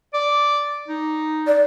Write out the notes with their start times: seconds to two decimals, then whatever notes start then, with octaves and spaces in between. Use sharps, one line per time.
0.14 D5
0.88 D#4
1.47 D5